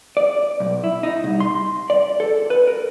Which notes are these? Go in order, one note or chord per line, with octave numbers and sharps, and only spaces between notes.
D5
B1
E4
D#4
C2
C6
D5
A4
B4
A#4